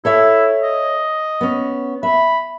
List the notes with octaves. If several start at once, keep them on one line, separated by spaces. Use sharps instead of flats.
E4 A4 C#5 E5
D#5
B3 C#4
E5 B5